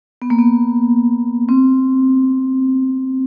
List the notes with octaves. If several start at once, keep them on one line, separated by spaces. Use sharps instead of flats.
B3
A#3
B3
C4